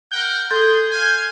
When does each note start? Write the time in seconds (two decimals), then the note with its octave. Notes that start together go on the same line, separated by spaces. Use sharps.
0.11 A#4 F#5 G5 G6
0.51 G#4 A4 C6 G6
0.90 F5 G#5